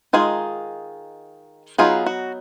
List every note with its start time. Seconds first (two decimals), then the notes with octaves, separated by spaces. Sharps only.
0.13 D#3 G#3 D#4 F4 G#4
1.78 F#3 B3 D#4 F4 G#4
2.06 F#4